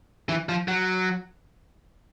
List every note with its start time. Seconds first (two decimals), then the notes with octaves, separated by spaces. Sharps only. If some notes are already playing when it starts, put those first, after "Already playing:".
0.29 E3
0.49 F3
0.68 F#3